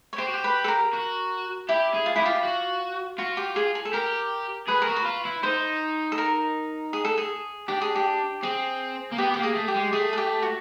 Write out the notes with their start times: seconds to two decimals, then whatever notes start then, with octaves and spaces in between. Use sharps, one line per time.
0.13 C#5
0.18 G4 C5
0.27 F#4
0.34 G4
0.44 B4
0.64 A4
0.68 A#4
0.94 F#4
1.69 E4 G4
1.94 G#4
2.06 F4
2.16 E4 G4
2.26 F4
2.43 F#4
3.18 F4 F#4
3.37 G4
3.56 G#4
3.75 G#4
3.85 A4
3.93 G4 A#4
4.68 G#4 B4
4.82 A#4
4.88 F#4
4.96 B4
5.06 F4
5.25 E4
5.43 D#4 C5
6.12 A4
6.18 A#4
6.93 G#4
7.05 A4
7.18 G#4
7.68 D4 G4
7.81 G#4
7.96 G4
8.43 C4 G#4
9.12 A#3
9.18 B3 G4
9.34 A#3 G4
9.43 G#4
9.55 A3
9.68 G4
9.75 G#3
9.93 A3 G#4
10.13 G#4
10.18 G4
10.42 F#4